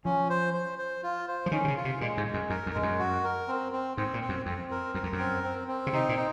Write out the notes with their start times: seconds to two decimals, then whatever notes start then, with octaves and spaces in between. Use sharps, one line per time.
0.05 F3 C#4
0.30 C5
0.54 C5
0.78 C5
1.03 F4
1.28 C5
1.46 F3
1.51 D#3 C#4
1.64 C3
1.68 C#3
1.76 F4
1.85 C3
2.00 A#2 G#3
2.17 G#2
2.26 G#3
2.34 F#2
2.50 F#2 A#4
2.66 F2
2.74 G#2 G#3
2.83 F#2
2.98 F#4
3.24 A#4
3.48 C4
3.72 C4
3.97 G#2 C4
4.14 A#2
4.21 C4
4.29 F#2
4.46 F2 C4
4.71 A#4
4.94 F#2 A#4
5.03 F2
5.13 F#2
5.19 C4
5.43 C4
5.68 C4
5.87 C#3
5.93 C3 D#4
6.09 A#2
6.17 D#4